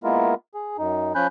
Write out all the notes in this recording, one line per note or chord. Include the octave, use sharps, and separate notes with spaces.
G#3 A#3 B3 E4 F4 A#4
G#4
F#2 D#4
F3 C#4 G#5 B5 F#6 G6